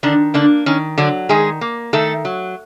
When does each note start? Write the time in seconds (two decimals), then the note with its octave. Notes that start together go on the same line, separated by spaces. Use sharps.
0.03 D3 D#3 D4
0.34 D3 A#3 D4
0.66 D#3 C#4
0.98 D3 F#3 D4
1.29 D#3 G#3 G#4
1.61 A#3
1.93 D#3 A3 A4
2.25 F#3